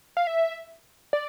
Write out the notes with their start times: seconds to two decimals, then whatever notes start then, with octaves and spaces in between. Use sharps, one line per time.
0.17 F5
0.27 E5
1.13 D5